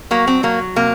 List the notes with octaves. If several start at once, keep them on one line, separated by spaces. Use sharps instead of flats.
F#3 A#3
C4
F#3 A#3
C3 A#3